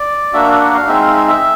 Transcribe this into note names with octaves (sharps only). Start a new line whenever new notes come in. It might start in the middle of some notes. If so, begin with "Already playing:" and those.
Already playing: D5
A#3 D4 F#4 E5
F#5
F5
G#3 C4 D#4 E5
F5
E5
E5